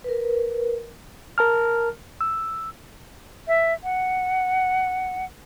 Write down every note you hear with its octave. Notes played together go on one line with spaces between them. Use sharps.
A#4 B4
A#4 A5 F6
E6
E5
F#5